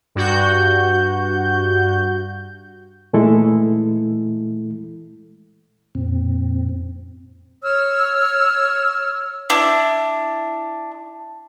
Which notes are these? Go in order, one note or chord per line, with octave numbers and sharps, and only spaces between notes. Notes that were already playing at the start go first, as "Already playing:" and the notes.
G2 F#4 G6
A#2 E3 G#3 A3 E4 A4
F2 A#2 C4
C#5 E6 F6
D4 E4